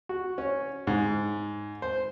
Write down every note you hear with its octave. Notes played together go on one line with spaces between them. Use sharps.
F#4
C#4
G#2
C5